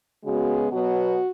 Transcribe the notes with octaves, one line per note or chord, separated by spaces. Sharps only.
C#3 G#3 B3 F#4
B2 F#3 B3 F#4